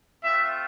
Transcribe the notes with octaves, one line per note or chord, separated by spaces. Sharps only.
A3 C4 F4 E5